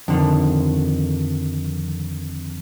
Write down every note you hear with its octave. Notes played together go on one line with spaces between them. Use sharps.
F2 D3 D#3